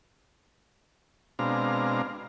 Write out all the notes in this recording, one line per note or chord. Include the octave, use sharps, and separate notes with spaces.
B2 G#3 C4 D4 F5 A#5